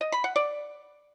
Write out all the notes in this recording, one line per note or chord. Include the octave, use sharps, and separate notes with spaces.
D#5
B5
F#5
D5